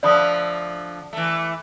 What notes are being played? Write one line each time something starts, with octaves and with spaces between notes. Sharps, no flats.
D3 F3 A3 D5 B5 D#6
E3 A3